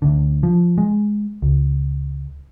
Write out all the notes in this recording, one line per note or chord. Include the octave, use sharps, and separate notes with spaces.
D2 D3
F3
G#3
C#2